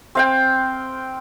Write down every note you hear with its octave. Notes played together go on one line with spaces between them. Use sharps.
C4 F5 G5